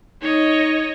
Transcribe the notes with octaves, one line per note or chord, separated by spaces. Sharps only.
D#4 C#5 D#5